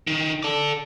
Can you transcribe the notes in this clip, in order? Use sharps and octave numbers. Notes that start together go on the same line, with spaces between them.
D#3
A4 D5